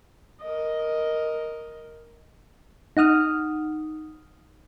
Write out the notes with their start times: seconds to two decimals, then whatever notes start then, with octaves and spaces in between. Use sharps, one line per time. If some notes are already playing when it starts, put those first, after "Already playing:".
0.41 A#4 D#5
2.97 D#4 F#5 D#6 F6